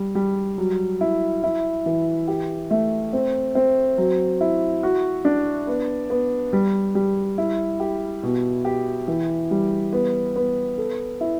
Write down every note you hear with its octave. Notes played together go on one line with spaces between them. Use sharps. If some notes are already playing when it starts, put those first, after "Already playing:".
Already playing: G3
G3
F#3
E4
E4
E3
G4
A3
C4
C4
F#3
E4
F#4
D4
B3
B3
G3
G3
E4
G4
B2
G4
E3
G3
B3
B3
A4
E4